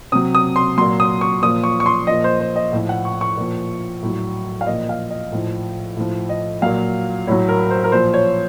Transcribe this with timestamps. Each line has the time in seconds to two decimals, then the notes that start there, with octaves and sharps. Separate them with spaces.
0.12 C3 F#3 D#6
0.35 D#6
0.56 C6
0.77 A#2 F#3 C6
1.00 D#6
1.21 C#6
1.42 A#2 F3 D#6
1.64 C#6
1.80 C#6
1.86 C6
2.07 A#2 F3 D#5
2.24 C5
2.40 C5
2.56 D#5
2.72 A2 F3
2.89 F#5
3.05 C#6
3.21 C#6
3.37 A#2 F3
4.03 A2 F#3
4.61 F5
4.67 A#2 F3 D#5
4.89 F5
5.10 D#5
5.32 A2 F3
5.97 A2 F3
6.29 D#5
6.62 A#2 F#3 F5
7.27 A2 F#3 C#5
7.49 A#4
7.71 C5
7.84 A#4
7.92 A#2 F3 C5
8.14 C#5